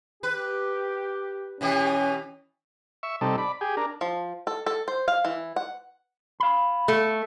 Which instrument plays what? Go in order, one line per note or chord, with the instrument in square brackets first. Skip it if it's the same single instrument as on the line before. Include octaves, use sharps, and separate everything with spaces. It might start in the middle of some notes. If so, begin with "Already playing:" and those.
[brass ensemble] G4 [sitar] B4
[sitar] B2 E3 G4 [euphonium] C#4
[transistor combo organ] E5 C#6
C3 G3 D#4 A4
D5 B5
G4 G#4
D4 A#4
[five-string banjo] F3
A4
A4
C5
F5
E3
F#5
[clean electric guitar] F5 B5
[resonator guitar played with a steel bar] A3